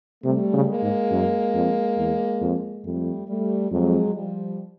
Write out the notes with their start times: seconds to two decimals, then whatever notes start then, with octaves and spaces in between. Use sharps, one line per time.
0.24 C3 G3 A3
0.53 C#3
0.67 G#3 A#3
0.82 G#2
1.11 F#2
1.54 F2
1.98 E2
2.41 F2
2.84 F2 G3 A3
3.27 G3 A3
3.71 F2 F#3 G#3
4.14 F3 G3